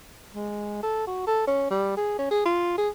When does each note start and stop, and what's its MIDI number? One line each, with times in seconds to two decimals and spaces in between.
0.34 0.80 56
0.83 1.04 69
1.07 1.22 66
1.27 1.46 69
1.47 1.66 61
1.71 1.93 55
1.97 2.18 68
2.19 2.28 61
2.31 2.42 68
2.45 2.73 65
2.78 2.89 68